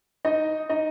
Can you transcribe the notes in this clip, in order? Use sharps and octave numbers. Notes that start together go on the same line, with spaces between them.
D#4 D#5
D#4 D#5